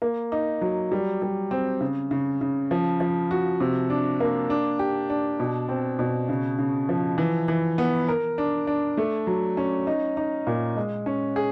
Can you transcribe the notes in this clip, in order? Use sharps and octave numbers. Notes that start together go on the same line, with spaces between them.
A#3
D#4
F#3
G3
G3
C4
C#3
C#3
C#3
F3
F3
F#4
C3
D4
A#3
D4
G4
D4
B2
C4
B2
C#3
C#3
F3
E3
E3
B3
A#4
D4
D4
A3
F#3
C#4
D#4
D#4
A#2
G#3
C#4
G#4